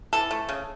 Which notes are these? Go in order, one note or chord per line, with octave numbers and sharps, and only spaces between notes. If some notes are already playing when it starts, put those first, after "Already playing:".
E3 A4
A3
C#3